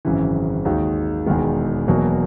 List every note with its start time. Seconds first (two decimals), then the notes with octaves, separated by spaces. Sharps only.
0.05 G#1 F#2 C#3 E3
0.65 D#2 D#3 G#3 D#4 F#4
1.26 E1 E2 D#3 G#3
1.88 E1 E2 B2 F#3 A#3